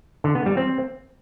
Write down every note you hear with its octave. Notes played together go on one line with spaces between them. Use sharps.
D3
B3
G3
C4